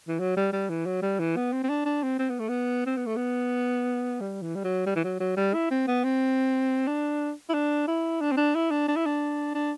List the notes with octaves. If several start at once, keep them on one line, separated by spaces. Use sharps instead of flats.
E3
F#3
G3
G3
E3
F#3
G3
E3
B3
C4
C4
D4
D4
C4
C4
B3
A3
B3
C4
B3
A3
B3
G3
E3
G3
F#3
G3
E3
F#3
F#3
G3
E4
C4
B3
C4
D4
E4
D4
E4
D4
C4
D4
E4
D4
D4
E4
D4
D4